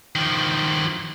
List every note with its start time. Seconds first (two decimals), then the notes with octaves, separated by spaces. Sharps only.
0.15 D#3 F3